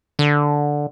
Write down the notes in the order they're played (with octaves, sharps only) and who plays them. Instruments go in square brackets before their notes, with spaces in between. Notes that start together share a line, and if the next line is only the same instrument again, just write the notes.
[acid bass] D3